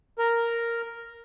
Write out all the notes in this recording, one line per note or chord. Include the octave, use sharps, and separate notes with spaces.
A#4